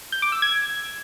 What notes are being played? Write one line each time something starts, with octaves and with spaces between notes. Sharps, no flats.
G6
D6
E6
G#6